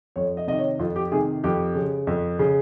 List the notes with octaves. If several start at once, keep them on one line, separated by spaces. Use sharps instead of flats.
F2 C#5
D#5
C3 D#3 D#5
C#5
F2 F4
G4
C3 D#3 G#4
F2 G4
C#3
F2
C#3